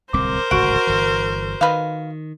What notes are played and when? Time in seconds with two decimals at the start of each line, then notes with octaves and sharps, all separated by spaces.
0.13 D1 C2 C4 A#4 C5 D6
0.51 D1 G#1 C#2 F#4 F#5 C#6 D7
0.87 G1 E3
1.61 D#3 B4 D#5 F5